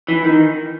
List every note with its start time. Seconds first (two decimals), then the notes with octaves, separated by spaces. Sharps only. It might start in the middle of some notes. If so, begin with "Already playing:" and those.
0.08 E3
0.25 D#3